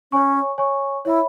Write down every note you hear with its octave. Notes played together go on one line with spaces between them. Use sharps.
C#4 C#5 G#5 C#6
C#5 G#5 C#6
E4 C#5 E5 B5